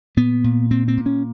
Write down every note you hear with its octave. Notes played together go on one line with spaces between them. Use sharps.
A#2 B3
A#2
A#2 C4
C4
A#2
C#4